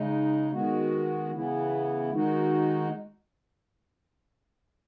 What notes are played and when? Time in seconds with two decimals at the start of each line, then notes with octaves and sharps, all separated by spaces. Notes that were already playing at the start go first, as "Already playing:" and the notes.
Already playing: C#3 G#3 D#4
0.52 D#3 G#3 B3 F#4
1.31 C#3 E3 B3 E4
2.11 D#3 G#3 D#4 F#4